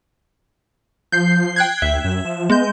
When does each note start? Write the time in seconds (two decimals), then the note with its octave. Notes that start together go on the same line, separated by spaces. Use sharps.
1.12 F3 G6 C7
1.56 G5 F#6 G#6
1.82 D2 E5
2.04 F#2
2.25 F3
2.50 G#3 B3 G6